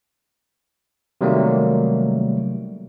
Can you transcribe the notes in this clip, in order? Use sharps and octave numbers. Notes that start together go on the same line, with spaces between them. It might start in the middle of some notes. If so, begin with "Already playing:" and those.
C3 D#3 F#3 G3 A3 A#3